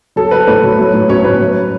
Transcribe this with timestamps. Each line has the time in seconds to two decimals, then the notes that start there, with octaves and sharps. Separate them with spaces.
0.16 F#3 A4
0.31 F#3 B4
0.47 A2 B4
0.63 F#3
0.79 F#3
0.94 A2
1.09 F#3 C#4 C#5
1.24 A2 B4
1.39 F#3